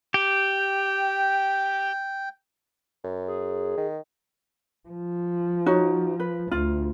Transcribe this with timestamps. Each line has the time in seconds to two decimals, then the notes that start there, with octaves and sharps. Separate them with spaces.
0.14 G4 G5
3.04 F#2
3.28 G#4
3.77 D#3
4.88 F3
5.66 D#4 F#4 C#5
6.20 B4
6.51 D2 F4